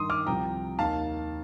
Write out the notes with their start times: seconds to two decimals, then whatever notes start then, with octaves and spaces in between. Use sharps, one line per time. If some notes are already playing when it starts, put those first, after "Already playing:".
Already playing: G2 D#3 C6 D#6
0.10 D6 F6
0.27 C2 C3 F3 G5 A#5
0.78 D#2 D#3 F5 A5